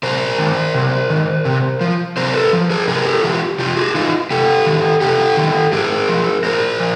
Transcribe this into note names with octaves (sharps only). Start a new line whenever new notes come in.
C3 A#4 C5
D#3
C3
D#3
C3
F3
C3 A#4 C5
A4 B4
F3
G#4 A#4
C3 G#4 A#4
G4 A4
E3 F4 G4
C3 F4 G4
F#4 G#4
E3 D#4 F4
C3 G4 A4
D#3
C3 G4 A4
D#3
A2 G#4 A#4
F3
A2 A#4 C5
F3